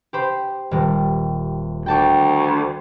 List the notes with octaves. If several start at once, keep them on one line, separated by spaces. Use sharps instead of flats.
G4 C5 B5
D#1 G3
D2 G5 A5 D6